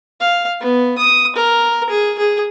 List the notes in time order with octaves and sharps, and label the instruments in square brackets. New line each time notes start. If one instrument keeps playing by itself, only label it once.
[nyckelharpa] F5
B3
D#6
A#4
G#4
G#4